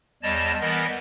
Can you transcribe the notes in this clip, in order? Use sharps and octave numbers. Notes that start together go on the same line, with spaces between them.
E2 G3 C#5 D#5 A5 A6
E3 G3 B3 A#4 D#5